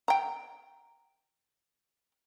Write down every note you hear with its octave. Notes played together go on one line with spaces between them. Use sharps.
G5 A#5